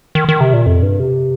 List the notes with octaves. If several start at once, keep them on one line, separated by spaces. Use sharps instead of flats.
D#3
D#3
C3
A#2
F2
G2
C3